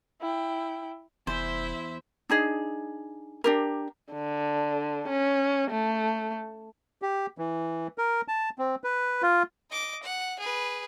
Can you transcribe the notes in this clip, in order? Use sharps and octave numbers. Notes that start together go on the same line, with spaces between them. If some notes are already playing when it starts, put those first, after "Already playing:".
E4 G5
F1 E2 E4 C5 E5
D4 D#4 G#4
D4 G4 A#4
D3
C#4
A3
G4
E3
A#4
A5
C4
B4
F4
D#5 D6
F#5
G#4 B4